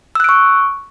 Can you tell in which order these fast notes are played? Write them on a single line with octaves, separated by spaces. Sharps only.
E6 F#6 D7 C#6